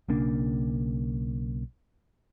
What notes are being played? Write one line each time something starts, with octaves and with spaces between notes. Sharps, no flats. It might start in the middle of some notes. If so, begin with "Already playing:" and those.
B1 C#3 A#3 D4